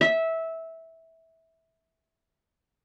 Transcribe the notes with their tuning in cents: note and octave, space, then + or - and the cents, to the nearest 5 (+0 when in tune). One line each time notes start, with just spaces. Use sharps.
E5 -15